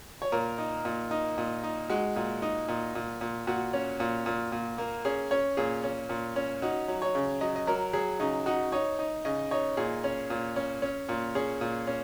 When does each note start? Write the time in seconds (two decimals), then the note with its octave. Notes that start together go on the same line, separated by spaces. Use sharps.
0.22 C#5
0.32 A#2 A#4
0.58 D#4
0.85 A#2
1.11 D#4
1.38 A#2
1.63 D#4
1.90 G#3 F#4
2.16 A#2
2.42 D#4
2.68 A#2
2.95 A#2
3.21 A#2
3.47 A#2 F#4
3.73 C#4
4.00 A#2
4.26 A#2
4.52 A#2
4.78 A#3
5.05 C#4 G#4
5.31 C#4 C#5
5.57 A#2 G#4
5.84 C#4
6.09 A#2
6.36 C#4
6.62 D#4 F#4
6.88 F#3
7.02 C#5
7.15 C#3
7.41 F#3 D#5
7.56 D#5
7.67 F#3 A#4
7.93 F#3 G#4
8.20 C#3 D#4
8.46 D#4 F#4
8.72 D#4 C#5
8.99 D#4
9.25 C#3 D#5
9.51 D#4 C#5
9.77 A#2 G#4
10.04 C#4
10.30 A#2
10.56 C#4
10.82 C#4
11.09 A#2
11.35 C#4 G#4
11.61 A#2
11.87 C#4